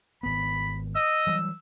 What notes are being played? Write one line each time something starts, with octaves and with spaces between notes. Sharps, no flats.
G#1 B3 B5
D#5 E6
E3 F#3 G3